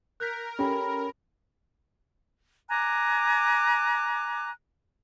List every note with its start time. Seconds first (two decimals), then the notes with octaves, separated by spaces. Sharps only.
0.20 A#4 F#6 G6 B6
0.59 C#4 G4 A4 G5 B5
2.69 G#5 A#5 D6 F#6